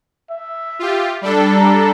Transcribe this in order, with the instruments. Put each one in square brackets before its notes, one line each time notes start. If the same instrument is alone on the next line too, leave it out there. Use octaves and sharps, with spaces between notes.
[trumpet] E5
[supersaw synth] F4 G4
G3 D4 A4
[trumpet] A#5